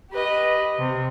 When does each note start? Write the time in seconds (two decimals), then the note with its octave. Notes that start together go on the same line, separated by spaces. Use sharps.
0.11 G4 B4 D#5
0.78 C3